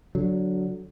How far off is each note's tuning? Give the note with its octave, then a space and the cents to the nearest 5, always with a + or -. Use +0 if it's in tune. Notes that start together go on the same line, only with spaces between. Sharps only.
D3 -15 F#3 +0